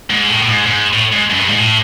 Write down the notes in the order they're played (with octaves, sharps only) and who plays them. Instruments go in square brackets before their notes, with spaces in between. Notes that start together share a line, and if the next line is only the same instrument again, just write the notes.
[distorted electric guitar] G#2
A2
A2
G#2
G#2
A2
G#2
F#2
G2
G#2
A2